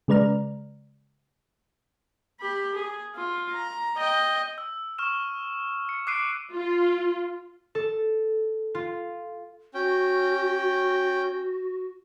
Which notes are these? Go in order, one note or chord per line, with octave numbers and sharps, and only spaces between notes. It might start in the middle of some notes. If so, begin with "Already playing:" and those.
C#3 G#3 B4 D5 A#5 F6
G4 B5
G#4
F4
A#5
D#5 G5
E6
C#6 F6 E7
C#7
D6 E6 F#6 C7 D7 D#7
F4
A4
F4
C#4 F#4 G5